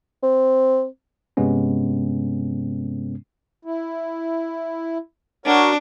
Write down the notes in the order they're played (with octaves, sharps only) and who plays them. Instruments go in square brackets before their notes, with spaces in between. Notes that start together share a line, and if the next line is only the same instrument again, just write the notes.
[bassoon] C4
[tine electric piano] G2 C3 G#3 B3 C#4
[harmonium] E4
[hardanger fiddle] D4 [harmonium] F#4 A#4 C#5